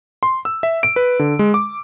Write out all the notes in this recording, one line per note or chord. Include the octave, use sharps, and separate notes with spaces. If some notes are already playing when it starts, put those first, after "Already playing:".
C6
E6
E5
D7
B4
D3
G#3
D6